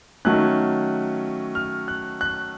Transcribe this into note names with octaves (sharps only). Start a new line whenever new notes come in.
D#3 F#3 A3 C#4 F#6
F6
F#6
F#6